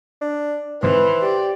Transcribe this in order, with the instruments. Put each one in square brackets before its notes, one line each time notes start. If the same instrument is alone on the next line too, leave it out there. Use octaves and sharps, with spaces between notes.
[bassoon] D4
[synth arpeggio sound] G#2 C3 D#3 [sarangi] E3 [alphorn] B4 [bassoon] C5
[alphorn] G4 [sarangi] D5